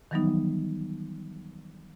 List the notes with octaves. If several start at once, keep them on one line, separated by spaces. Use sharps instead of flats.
D#3 E3 F#3 G3 B3 D#4